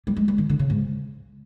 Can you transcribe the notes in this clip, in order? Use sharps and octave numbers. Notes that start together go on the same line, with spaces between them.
G3
G#3
G3
D#3
D3
C#3
G#2